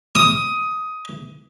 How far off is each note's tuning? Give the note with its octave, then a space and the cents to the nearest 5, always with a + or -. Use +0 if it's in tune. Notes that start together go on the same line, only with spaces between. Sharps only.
D#6 +15